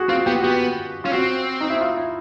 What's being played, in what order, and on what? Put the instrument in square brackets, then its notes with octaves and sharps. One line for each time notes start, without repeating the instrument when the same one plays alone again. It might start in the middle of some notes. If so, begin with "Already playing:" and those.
Already playing: [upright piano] F#4 G#4
[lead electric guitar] C4 [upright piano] F4
[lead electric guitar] B3 [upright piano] G4
[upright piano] F#4
[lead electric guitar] B3 [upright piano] G4
[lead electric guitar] C#4 [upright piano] F4
[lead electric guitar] C4 [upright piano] F#4
[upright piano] D#4
E4
F4
E4